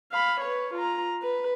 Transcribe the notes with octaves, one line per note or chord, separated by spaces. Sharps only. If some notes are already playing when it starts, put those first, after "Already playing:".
F5 B5
B4 C#5
F4 A#5
B4